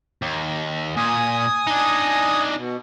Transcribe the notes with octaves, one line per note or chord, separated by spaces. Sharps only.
D#2
A#2 G#5 D#6
D4 D#4
B2